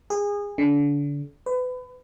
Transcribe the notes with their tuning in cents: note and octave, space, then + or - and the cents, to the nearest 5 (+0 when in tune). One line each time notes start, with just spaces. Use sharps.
G#4 -25
D3 -30
B4 +30